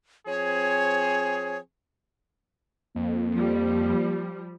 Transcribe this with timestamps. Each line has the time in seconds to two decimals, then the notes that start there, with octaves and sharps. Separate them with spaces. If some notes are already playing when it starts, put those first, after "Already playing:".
0.27 F3 C4 G#4 C#5
2.96 F2 A#3
3.32 F3 G3